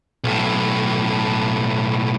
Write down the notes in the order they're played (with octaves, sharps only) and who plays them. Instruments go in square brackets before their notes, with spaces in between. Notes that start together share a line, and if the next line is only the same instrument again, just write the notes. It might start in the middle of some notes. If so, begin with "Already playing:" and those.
[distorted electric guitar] B1 A2